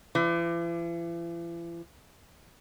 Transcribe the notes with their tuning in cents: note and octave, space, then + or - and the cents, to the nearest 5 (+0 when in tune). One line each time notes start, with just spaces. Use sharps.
E3 +45